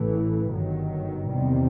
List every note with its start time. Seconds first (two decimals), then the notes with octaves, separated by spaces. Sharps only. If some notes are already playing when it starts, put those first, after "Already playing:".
Already playing: A1 A2 E3 A3
0.50 G1 G2 D#3 F#3
1.28 E2 C3 D#3 G3 C4